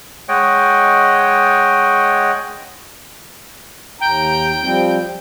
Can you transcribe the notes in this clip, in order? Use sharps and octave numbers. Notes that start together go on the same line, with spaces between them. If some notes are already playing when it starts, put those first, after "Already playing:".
G#3 C#5 D#5 F#5 G5
D#2 G5 A#5
F3 G3 C4